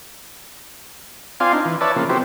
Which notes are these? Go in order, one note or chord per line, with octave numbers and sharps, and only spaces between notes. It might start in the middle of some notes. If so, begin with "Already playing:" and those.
C4 F4 D5 F5 G#5 C6
D4 D#4
E3
B4 C#5 D5 E5 A5
C#3 F3 A#3
F#3 B3 C4 E4 G4 C5